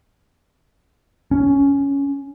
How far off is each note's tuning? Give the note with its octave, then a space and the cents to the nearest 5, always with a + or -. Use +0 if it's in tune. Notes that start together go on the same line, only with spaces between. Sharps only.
C#4 +10